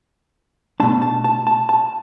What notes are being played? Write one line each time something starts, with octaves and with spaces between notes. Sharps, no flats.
B2 A3 D4 A5
A5
A5
A5
A5